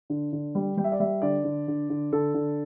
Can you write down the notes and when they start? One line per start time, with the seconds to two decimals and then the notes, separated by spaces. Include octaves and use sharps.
0.10 D3
0.33 D3
0.55 G3
0.77 G3 G5
0.84 E5
0.92 D5
1.00 G3 E5
1.22 D3 D5
1.44 D3
1.68 D3
1.90 D3
2.12 D3 A4
2.34 D3